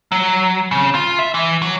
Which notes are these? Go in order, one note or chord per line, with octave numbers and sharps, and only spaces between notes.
F#3
C#3
F4
E5
E3
F#3